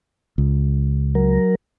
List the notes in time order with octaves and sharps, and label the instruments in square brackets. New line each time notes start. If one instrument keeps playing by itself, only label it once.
[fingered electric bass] C#2
[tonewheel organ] F#3 A#4